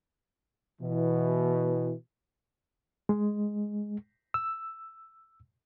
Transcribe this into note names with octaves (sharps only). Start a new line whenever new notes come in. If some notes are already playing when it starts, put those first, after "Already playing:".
B2 E3
G#3
E6